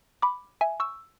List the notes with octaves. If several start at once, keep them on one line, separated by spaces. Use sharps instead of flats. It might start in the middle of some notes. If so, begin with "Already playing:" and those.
B5 D6
E5 G#5
C#6 E6